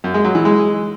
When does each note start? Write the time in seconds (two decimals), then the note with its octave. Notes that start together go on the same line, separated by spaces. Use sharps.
0.04 F#2
0.14 G#3
0.25 F#3
0.35 E3
0.45 G#3